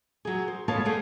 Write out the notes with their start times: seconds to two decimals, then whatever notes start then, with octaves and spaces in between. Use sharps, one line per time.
0.25 F#3 G#4
0.48 C5
0.68 G#3 B3 A4 C#5 F5 A5
0.85 G3 A3 B3 G#4 F5